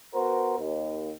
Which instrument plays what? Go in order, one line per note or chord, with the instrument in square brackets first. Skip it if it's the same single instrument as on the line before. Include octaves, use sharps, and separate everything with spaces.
[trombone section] B3 F#4 A#4 C5
D#2